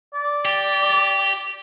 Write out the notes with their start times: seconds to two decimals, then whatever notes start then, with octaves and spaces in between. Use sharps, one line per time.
0.14 D5
0.45 G4